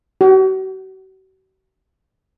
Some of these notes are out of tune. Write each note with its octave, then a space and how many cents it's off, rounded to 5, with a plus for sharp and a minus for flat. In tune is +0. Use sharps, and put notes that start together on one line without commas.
F#4 +40